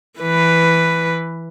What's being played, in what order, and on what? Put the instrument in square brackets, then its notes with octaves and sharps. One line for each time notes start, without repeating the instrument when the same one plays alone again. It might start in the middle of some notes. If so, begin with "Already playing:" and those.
[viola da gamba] E3 B4